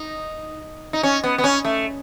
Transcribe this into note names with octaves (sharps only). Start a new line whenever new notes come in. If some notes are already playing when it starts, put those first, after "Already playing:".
Already playing: D#4
D#4
C#4
B3
B3
C#4
A3